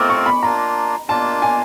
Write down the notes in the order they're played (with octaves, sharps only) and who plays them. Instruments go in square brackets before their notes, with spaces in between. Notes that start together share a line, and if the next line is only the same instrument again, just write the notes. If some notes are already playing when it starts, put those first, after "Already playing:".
Already playing: [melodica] A3 C4 F4 A#4 [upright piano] D6
[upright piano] C#6
B5
[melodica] A#3 D4 F4 [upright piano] A#5
[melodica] A#3 D4 F4 [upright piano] A5
[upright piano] G#5